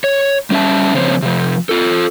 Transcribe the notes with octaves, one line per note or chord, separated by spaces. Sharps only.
C#5
G3 C#4 D5 E5 A5
C#3 F3 C4 C5 C#5
C3 F3
F4 A4